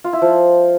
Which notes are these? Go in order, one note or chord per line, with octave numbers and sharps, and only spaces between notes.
F4
E4
F3